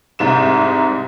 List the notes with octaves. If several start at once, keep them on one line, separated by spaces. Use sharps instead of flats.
C2 G#2 E7